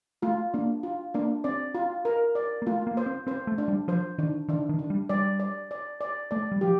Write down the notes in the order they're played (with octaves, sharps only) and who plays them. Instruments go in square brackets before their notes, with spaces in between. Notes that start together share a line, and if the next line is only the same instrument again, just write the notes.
[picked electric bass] A3 [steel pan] F4
[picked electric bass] A#3 [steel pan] D4
[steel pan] F4
[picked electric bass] A#3 [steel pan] D4
[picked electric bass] C4 [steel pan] D5
[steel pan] F4
A#4
D5
[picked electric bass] A#3
[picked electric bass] A3 [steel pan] F4
[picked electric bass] A#3
[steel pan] C5
[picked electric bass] C4
[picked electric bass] C4 [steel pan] C5
[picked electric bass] A3
[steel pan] D4
[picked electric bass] G3
[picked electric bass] F3 [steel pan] C5
[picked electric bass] D#3 [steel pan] D4
[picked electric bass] D#3 [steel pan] D4
[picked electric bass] D#3
[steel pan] D4
[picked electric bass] G3
[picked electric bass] G3 [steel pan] D5
[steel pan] D5
D5
D5
[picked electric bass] A3 [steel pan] D5
[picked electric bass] G3
[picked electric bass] F3 [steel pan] G4